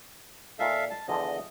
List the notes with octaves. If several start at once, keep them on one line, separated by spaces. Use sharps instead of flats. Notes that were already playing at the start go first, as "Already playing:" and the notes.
A#2 D#4 A4 E5 F5
A5
E2 D3 F3 D#5